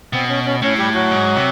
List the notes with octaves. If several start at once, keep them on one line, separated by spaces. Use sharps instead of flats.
B2 C4
C#4
C#4
A2 C#4
G3 G4
F#3 F#4
G#2
C3